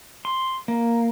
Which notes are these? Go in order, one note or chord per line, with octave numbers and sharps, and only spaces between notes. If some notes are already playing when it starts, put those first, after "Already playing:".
C6
A#3